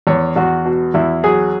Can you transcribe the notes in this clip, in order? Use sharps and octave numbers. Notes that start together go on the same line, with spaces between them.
E2 C#5
E2 F#4
B2
E2 E4
F#3 G#4